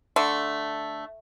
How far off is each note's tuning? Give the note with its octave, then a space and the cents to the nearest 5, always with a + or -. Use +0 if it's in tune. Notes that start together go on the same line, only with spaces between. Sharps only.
D3 +0 A3 +0